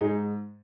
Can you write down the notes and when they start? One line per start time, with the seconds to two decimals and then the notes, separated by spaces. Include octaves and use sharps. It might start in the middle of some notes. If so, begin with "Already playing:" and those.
0.01 G#2 D#4 G#4